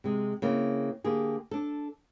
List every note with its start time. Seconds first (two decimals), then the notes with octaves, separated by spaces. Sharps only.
0.04 C3 G#3
0.42 C#3 A#3 C4 E4
1.04 D3 A#3 G4 G#4
1.51 D4 A4